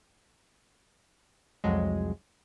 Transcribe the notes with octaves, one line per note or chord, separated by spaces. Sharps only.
C2 F2 F#3 G#3